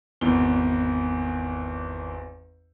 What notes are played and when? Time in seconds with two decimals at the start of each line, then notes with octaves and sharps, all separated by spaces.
0.21 G#1 E2 B2 E3 G7